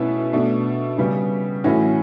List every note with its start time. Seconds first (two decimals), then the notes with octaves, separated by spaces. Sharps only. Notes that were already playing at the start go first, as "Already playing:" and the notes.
Already playing: B2 A3 C#4 E4 B4
0.33 B2 A3 D4
0.98 C#3 G3 B3
1.64 A2 E3 A3 C#4 F#4